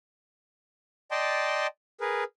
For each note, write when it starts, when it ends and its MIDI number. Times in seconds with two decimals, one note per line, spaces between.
1.11 1.67 74
1.11 1.67 75
1.11 1.67 79
1.11 1.67 81
1.11 1.67 84
2.01 2.24 68
2.01 2.24 70
2.01 2.24 71